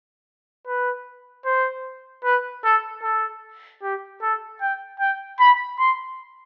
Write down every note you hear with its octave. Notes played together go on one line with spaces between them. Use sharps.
B4
C5
B4
A4
A4
G4
A4
G5
G5
B5
C6